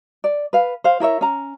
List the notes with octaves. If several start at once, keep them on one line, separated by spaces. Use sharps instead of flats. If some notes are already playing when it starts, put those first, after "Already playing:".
D5
B4 F5
C5 F5
E4 A#4 C#5 E5
C#4 A#5